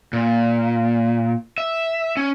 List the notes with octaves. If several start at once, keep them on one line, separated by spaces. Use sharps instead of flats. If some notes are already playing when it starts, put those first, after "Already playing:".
A#2
E5
C#4